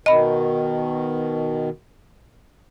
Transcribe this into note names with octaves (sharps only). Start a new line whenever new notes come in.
B2 D#3 D#5 B5